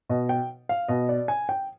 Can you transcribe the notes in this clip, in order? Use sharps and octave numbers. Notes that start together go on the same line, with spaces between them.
B2 D#5
G5
F5
B2 D#5
D5
G#5
G5